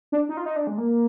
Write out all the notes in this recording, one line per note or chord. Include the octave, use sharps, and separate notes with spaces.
D4
D#4
F4
D#4
D4
G#3
A#3